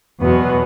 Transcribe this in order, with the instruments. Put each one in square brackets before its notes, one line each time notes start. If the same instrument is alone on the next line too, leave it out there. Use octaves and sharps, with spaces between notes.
[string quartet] E2 B2 F#3 B3